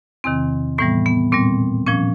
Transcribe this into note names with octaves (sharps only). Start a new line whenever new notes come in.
E2 C3 D#3 C4
A2 E3 G3 B3
B3
A#2 G3 C4
A#2 F3 C#4